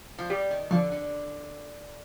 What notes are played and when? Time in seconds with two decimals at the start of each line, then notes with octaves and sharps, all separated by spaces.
0.18 F3
0.30 G3 G4
0.51 D#3
0.71 D3 F3
0.92 D3